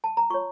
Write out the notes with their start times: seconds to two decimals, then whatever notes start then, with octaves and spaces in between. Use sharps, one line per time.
0.04 A5
0.17 A#5
0.30 F4 C#5 C#6